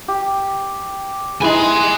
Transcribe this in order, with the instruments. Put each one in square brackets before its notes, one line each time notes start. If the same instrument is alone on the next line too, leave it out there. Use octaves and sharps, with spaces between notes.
[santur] G4
[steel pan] D#4 E4 G#4 [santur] B4 [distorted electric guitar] G#5 C6